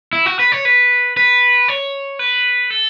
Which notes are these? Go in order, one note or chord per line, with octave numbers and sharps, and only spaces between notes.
E4
F#4
B4
C#5
B4
B4
C#5
B4
A4